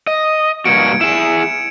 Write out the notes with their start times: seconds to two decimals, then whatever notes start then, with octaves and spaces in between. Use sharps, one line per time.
0.07 D#5
0.65 G2 A#3 F#4 G#6 C#7 D7
1.01 E4 G#4 E7